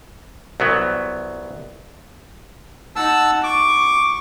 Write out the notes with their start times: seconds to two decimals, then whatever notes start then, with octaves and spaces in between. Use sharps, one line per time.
0.60 C2 F#3 B3
2.96 D#4 F#5 A5 E6
3.43 C#6 D6